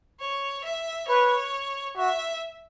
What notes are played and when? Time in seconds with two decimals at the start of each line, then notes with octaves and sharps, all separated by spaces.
0.21 C#5
0.64 E5
1.08 B4 C#5
1.96 F#4 E5